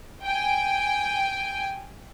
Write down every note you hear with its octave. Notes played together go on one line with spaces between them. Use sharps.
G5 G#5